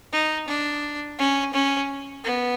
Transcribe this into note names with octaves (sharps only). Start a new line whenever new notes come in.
D#4
D4
C#4
C#4
B3